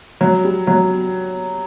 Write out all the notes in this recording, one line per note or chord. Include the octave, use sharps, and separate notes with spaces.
F#3
G3
F#3